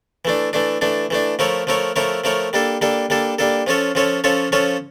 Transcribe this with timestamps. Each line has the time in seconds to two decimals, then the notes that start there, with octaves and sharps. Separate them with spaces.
0.25 E3 A3 D4
0.53 E3 A3 D4
0.81 E3 A3 D4
1.10 E3 A3 D4
1.39 F3 A3 E4 A#4 C#5
1.67 F3 A3 E4 A#4 C#5
1.96 F3 A3 E4 A#4 C#5
2.24 F3 A3 E4 A#4 C#5
2.53 G3 A#3 D4 A4
2.81 G3 A#3 D4 A4
3.10 G3 A#3 D4 A4
3.39 G3 A#3 D4 A4
3.67 F3 C#4 F4 A4 C#5
3.95 F3 C#4 F4 A4 C#5
4.24 F3 C#4 F4 A4 C#5
4.52 F3 C#4 F4 A4 C#5